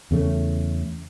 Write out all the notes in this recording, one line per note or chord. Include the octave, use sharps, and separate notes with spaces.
E2 C#3 A3